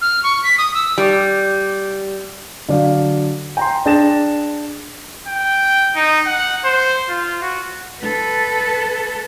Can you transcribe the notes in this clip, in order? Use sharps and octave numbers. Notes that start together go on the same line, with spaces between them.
F6
C#6
B6
D#6
E6
G3
D3 F#3 D5 F5
G5 A#5 C6
D4 G#4 G5 A6 A#6 E7
G5
D#4
F#5
C5
F4
F#4
A4 B4